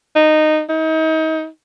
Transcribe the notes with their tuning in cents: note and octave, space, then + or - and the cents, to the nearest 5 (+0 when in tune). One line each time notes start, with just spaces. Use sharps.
D#4 -15
D#4 +35